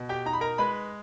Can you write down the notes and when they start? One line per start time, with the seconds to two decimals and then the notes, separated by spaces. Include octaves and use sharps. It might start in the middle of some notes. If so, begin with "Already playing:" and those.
Already playing: B2
0.09 G4 G5
0.26 D#4 A#5
0.33 B5
0.41 A#4 A#5
0.58 G#3 B4 B5